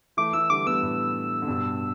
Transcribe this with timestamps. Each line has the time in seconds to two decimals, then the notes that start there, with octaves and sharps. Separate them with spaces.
0.17 E3 A3 D6
0.33 E3 A3 E6
0.50 D3 G3 D6
0.66 G3 B3 E6
0.83 A2
1.42 D3
1.47 G2 B2